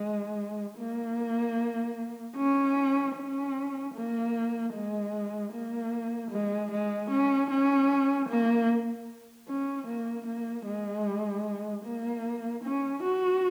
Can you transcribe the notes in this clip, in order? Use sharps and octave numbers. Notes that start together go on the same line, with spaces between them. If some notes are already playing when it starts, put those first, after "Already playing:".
Already playing: G#3
A#3
C#4
C#4
A#3
G#3
A#3
G#3
G#3
C#4
C#4
A#3
C#4
A#3
A#3
G#3
A#3
C#4
F#4